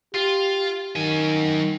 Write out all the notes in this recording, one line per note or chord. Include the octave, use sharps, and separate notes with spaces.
F4 G4
D#3 F#3 G#5